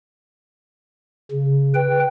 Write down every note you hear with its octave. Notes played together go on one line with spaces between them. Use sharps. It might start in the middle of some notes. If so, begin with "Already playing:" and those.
C#3
B4 G5